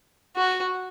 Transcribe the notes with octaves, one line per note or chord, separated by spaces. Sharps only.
F#4